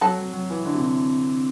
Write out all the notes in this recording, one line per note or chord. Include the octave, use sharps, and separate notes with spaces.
F#3 F#4 A4
F#3
F#3
E3
D3
C3
D3